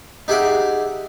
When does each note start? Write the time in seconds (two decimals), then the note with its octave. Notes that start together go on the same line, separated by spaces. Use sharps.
0.28 D#4 G4 G#4 E5 F#5 G5